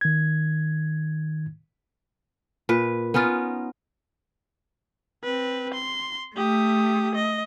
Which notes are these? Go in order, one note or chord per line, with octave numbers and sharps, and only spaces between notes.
D#3 G#6
A#2 B4
B3 C#4 D#4 F4
C4 B4
C6
A3 G4 D#6
D#5